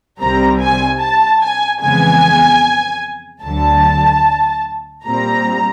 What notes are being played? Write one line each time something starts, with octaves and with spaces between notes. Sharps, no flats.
C2 C3 D#3 G3 C4 A#5
G#5
A5
G#5
F2 C#3 E3 G#3 B3 G#5
D2 D3 F#3 A5
A#2 G3 C4 A#5